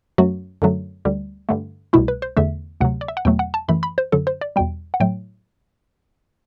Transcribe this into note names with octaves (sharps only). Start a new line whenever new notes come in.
F#2 F#3 A3 F#4
F#2 D3 F#3 A3
D2 D3 G3
G2 D3 A3
C2 B2 A3 E4
B4
C5
E2 D3 A3 E5
D2 C3 F#3 F#5
D5
E5
F#5
E2 B2 F#3 A3 G5
F#5
A5
F#2 E3 A3 B5
B5
C5
F#2 D3 F#3 A4
C5
D5
E2 B2 G3 G5
F#5
A2 F#3 A3 G5